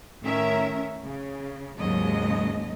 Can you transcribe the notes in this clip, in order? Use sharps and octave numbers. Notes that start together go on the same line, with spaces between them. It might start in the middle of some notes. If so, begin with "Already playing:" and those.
A2 D#3 C#4 A#4 E5
C#3
D#2 G#2 C#3 F#3 G#3 D#5